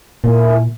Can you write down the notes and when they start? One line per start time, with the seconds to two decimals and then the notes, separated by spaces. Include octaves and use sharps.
0.24 A#2 E4 A#4 E5 G#5